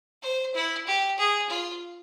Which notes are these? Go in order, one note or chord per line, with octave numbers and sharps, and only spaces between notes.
C5
E4
G4
G#4
F4